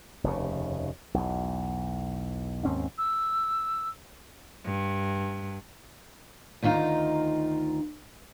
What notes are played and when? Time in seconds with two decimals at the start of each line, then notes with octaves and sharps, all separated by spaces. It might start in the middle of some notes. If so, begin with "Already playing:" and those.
0.24 F1 D#2 C#3
1.14 B1 E2
2.65 D#2 G#2 C4 C#4
2.98 E6
4.65 G2
6.62 D2 D#3 D#4 F4 A#5